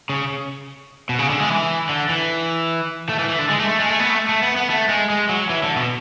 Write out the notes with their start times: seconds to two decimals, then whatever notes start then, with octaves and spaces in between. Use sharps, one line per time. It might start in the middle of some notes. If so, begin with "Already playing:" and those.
0.10 C#3
1.09 B2
1.19 C#3
1.29 D3
1.40 G#3
1.50 E3
1.89 D3
2.09 E3
3.09 A3
3.19 E3
3.29 E3
3.39 D3
3.50 G#3
3.59 A3
3.69 A3
3.80 G#3
3.89 A3
3.99 B3
4.10 A3
4.29 A3
4.43 B3
4.56 B3
4.70 A3
4.89 G#3
5.10 G#3
5.29 F#3
5.49 E3
5.63 D3
5.77 B2